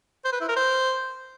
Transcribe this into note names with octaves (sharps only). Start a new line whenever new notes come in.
C5
B4
E4
A#4
C5